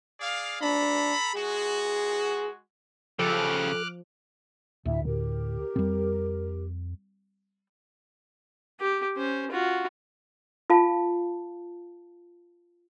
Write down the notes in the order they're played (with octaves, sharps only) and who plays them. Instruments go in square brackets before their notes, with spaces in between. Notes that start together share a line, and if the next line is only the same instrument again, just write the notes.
[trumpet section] G#4 D5 F5
[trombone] D4 [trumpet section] A4 A#5 B5
[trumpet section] G#3 F#4 [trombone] G#4
[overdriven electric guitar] C#3 G4 [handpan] F3 [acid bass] A4 [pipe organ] D6 F6 F#6
[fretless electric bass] D2 [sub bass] A2 [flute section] E4 E5
[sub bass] A2 [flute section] G4 A#4
[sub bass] F2 [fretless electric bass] G3 C4
[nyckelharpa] G4
C#4 C5
F4 F#4
[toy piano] F4 F5 A5